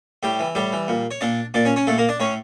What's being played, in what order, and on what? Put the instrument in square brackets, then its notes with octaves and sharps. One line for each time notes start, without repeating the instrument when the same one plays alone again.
[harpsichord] A2 G3 G4
E3
A2 G3 G4
E3
A#2
C#5
A#2 D4 D5
A#2 D4 D5
C#4 C#5
C#4 C#5
A#2 A3 A4
A#3 A#4
D4 D5
A2 C#4 C#5